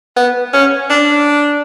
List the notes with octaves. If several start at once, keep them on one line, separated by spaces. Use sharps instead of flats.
B3
C#4
D4